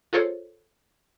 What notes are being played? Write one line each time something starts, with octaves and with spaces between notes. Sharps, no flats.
F4 G#4 A4 C5 C#5